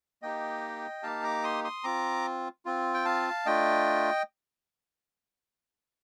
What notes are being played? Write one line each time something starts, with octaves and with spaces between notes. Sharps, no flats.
A#3 D#4 G4 D#5 G5
A#3 D#4 G4 F5 A5
A#5 D6
C6 D#6
C6 D#6
C4 F4 A#5 D6
C4 F4
G5
F5 A5
A3 D4 F4 D#5 G5